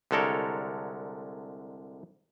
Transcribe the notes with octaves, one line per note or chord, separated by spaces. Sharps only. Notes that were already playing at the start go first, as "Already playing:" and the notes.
C2 D3 G#3 A4 A#4 C#5